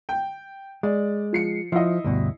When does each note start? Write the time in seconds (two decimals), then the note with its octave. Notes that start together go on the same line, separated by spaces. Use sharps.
0.09 G5
0.83 G#3 D5
1.33 F3 C7 C#7
1.72 F3 E4 D#5
2.04 D2 G2 B2